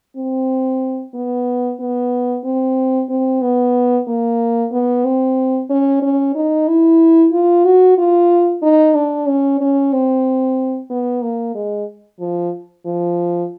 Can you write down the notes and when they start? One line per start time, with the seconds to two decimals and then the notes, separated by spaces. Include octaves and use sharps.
0.16 C4
1.14 B3
1.80 B3
2.44 C4
3.10 C4
3.41 B3
4.07 A#3
4.72 B3
5.04 C4
5.70 C#4
6.02 C#4
6.35 D#4
6.68 E4
7.32 F4
7.65 F#4
7.98 F4
8.62 D#4
8.95 D4
9.27 C#4
9.61 C#4
9.93 C4
10.90 B3
11.22 A#3
11.55 G#3
12.20 F3
12.85 F3